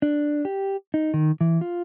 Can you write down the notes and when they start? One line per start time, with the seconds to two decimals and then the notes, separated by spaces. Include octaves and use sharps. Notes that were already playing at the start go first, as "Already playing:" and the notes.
0.02 D4
0.45 G4
0.94 D#4
1.14 D#3
1.41 E3
1.61 F4